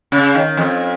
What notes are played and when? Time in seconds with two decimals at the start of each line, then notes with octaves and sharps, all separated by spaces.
0.12 C#3
0.35 D#3
0.57 F2